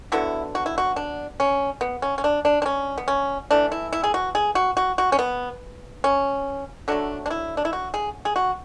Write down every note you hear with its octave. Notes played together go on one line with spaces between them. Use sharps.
D3 F#3 B3 E4
F#4
E4
F#4
D4
C#4
B3
C#4
C#4
D4
D4
D4
C#4
B3
C#4
E3 A3 D4
E4
E4
G#4
F#4
G#4
F#4
F#4
F#4
C#4
B3
C#4
D3 F#3 A3 D4
D4
E4
D4
E4
F#4
G#4
G#4
F#4